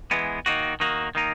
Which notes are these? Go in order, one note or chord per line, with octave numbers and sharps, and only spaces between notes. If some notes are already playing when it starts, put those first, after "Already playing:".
E3 G#3 B3
D#3 A#3 D#4 F#4
D#3 A#3 D#4 F#4
D#3 A#3 D#4